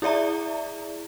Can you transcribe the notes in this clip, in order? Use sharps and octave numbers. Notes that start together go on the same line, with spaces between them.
E4 G#4 D5 E5 A#5